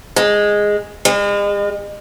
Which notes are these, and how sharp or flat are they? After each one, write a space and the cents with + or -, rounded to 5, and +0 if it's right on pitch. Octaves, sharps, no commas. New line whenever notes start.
G#3 -5
G#3 -40